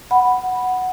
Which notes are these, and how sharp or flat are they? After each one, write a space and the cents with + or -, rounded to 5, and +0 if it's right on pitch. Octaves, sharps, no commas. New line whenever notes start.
F#5 +0 B5 +0